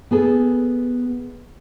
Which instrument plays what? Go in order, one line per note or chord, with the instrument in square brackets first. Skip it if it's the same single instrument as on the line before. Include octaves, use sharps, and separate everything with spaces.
[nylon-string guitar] B3 G#4 A4